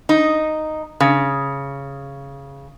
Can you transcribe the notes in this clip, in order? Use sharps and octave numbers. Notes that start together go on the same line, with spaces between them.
D#4
C#3